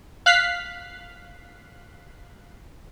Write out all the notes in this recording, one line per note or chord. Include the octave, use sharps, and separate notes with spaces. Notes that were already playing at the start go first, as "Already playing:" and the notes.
F5 F#6 B6 C7